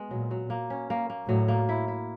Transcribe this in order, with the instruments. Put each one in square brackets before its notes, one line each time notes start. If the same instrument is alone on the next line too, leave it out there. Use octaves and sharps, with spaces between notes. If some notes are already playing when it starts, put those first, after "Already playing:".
Already playing: [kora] G#3 B3
[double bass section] A#2 [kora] F#3
[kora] F#3
A#3
C#4
A#3
A#3
[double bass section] A2 [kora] F#3
[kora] A#3
E4
E4